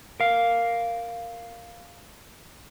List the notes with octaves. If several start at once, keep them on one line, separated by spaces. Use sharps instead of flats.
A#4 F5